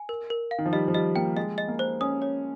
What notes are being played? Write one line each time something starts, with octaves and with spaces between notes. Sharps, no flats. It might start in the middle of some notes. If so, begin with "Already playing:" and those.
Already playing: G#5
A#4
A#4
F5
D#3
F3
G3 D#5
F3
G3 D#5
A#3 G5
G#3 D#5
D#5
A#3
C5
C#4 D#6
C#5